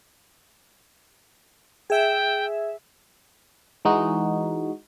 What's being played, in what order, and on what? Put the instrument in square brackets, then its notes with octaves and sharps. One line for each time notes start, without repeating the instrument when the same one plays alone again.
[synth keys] G#4 E5 [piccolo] G5
[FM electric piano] E3 G#3 D#4 F#4